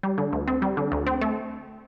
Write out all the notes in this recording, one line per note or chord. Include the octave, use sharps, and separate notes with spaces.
G3
D3
D2
C4
G3
D3
D2
C4
A3